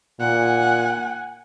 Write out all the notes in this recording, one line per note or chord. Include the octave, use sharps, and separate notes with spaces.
A#2 F#5 G#5